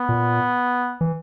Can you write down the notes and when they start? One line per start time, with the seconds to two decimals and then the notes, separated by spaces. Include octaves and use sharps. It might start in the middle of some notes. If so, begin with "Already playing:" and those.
Already playing: B3
0.09 A#2
1.01 E3